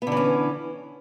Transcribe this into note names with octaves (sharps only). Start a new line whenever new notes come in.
D3 E3 B3 C#4